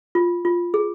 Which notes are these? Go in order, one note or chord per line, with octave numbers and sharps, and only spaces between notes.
F4
F4
G#4